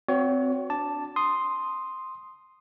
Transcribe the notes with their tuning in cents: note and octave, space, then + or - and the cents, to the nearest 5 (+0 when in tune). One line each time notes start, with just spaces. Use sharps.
C4 -15 F#4 -15 C#5 +35
D4 -10 A5 +0 D6 +0
C6 +0 D#6 +0